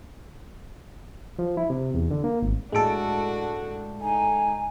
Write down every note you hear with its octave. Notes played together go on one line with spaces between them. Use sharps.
F3
E4
C3
E2
D3
A#3
G#1
A2 G#3 D4 F#4 A4 D7
D#4 G#5